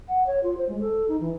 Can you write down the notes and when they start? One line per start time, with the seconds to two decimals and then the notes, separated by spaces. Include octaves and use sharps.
0.08 F#5
0.26 C#5
0.43 F4
0.58 C5
0.69 G#3
0.80 A4
1.08 D#4
1.20 E3